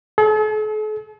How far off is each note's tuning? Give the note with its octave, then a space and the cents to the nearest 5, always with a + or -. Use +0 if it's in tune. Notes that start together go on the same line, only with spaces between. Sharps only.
A4 -45